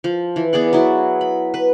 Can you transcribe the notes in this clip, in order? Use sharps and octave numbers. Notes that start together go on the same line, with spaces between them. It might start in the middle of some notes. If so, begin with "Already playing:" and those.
F3
E3
B3 G#4 D5 F#5
F#3 E4 F#4
B5
B4